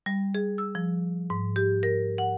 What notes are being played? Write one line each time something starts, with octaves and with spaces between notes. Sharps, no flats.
G3
G#4
E6
F3
G#2
G4
A#4
F#5